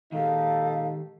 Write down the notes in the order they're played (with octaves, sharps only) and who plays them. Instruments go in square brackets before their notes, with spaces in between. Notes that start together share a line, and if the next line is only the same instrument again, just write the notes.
[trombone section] A#2 D#4 A4 [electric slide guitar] D#3 G#3 G4 [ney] F5